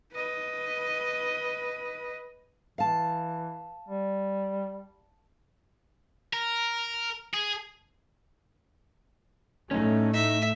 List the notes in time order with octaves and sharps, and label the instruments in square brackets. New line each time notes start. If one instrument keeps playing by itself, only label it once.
[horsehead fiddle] B4 D#5
[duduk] E3 [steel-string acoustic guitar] F5 A5
[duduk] G3
[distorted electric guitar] A#4
G#4
[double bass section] A2 A3 [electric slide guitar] C#4 D#4
[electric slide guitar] D#4 [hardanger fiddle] E5